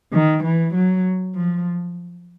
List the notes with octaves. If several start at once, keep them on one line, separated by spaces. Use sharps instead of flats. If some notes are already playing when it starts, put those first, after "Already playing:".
D#3
E3
F#3
F3